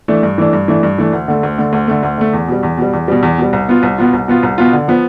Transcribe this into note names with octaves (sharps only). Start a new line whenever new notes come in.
E3 A3 D4
G2
E3 A3 D4
G2
E3 A3 D4
G2
E3 A3 D4
D2
D3 A3
D2
D3 A3
D2
D3 A3
D2
D3 A3
E2
B2 G3
E2
B2 G3
E2
B2 G3
E2
B2 G3
C2
B2 B3 F4
C2
B2 B3 F4
C2
B2 B3 F4
C2
B2 B3 F4
D3
F3 B3